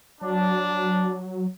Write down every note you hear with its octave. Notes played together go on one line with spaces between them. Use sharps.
F#3 D4